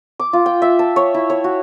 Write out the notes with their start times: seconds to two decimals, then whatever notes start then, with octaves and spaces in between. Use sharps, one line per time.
0.19 D6
0.33 F4
0.46 G5
0.62 E5
0.79 A5
0.96 C#5
1.14 E4
1.30 C#5
1.44 F#4